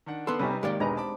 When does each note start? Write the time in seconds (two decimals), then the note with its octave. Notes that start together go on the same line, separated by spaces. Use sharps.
0.06 D#3 D4 F#5
0.27 B3 A4 C6
0.39 C3 G3 C#4 D#4 G4 B4
0.63 G#1 D#3 G#3 A#3 G4 D5
0.80 E1 D4 D#4 B4 G#5 A#5
0.97 C4 A5 B5 D6